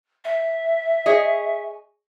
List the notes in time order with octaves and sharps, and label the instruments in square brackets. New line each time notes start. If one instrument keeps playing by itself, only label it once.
[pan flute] E5
[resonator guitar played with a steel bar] G#4 C#5 D#5